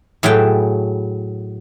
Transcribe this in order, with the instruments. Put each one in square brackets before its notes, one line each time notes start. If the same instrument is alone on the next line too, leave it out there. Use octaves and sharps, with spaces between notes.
[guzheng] A2 F#3 G#4 B4 G5 A5